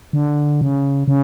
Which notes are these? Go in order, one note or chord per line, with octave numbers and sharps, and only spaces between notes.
D3
C#3
C#3